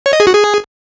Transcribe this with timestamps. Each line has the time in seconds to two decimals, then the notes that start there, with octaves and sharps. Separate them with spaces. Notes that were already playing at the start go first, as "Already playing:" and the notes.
0.06 C#5
0.13 D#5
0.20 G#4
0.27 F#4
0.34 G#4